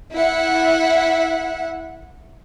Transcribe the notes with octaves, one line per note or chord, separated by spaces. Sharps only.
E4 E5 F#5